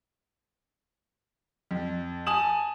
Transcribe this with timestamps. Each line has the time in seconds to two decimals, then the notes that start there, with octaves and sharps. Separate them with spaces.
1.71 F2
2.26 G#5 A5 D#6 E7 F#7